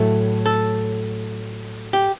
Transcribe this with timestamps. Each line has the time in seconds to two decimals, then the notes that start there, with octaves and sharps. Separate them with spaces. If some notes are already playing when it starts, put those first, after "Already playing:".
Already playing: A2 F#3 A3 A4
0.46 A4
1.93 G4